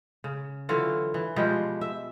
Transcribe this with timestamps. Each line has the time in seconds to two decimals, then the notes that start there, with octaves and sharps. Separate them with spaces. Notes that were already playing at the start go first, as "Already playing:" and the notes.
0.24 C#3
0.69 D3 E3 F#3 F4
1.14 E3
1.36 B2 F3 G3 G#3
1.81 E5